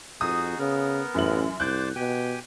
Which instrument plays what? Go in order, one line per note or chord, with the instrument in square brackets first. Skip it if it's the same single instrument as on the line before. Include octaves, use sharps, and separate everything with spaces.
[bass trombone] F2 [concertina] D#4 F#4 G#4 [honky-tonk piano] D#6
[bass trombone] C#3 [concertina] B3 A#4
[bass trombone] A1 [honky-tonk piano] F#2 E5 F#7
[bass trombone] C2 [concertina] C5 D5 D6 [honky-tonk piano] F#6 G6
[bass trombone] B2 [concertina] G4 G5 G#5